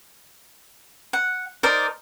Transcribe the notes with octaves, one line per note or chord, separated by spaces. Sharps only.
F#5
D#4 A#4 C5 D5